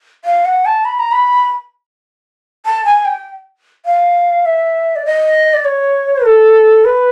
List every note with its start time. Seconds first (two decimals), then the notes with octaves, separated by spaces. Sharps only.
0.25 F5
0.45 F#5
0.65 A5
0.85 B5
0.99 A#5
1.12 B5
2.66 A5
2.85 G#5
3.05 G5
3.86 F5
4.46 E5
4.96 D5
5.06 D#5
5.54 D5
5.65 C#5
6.25 A4
6.85 B4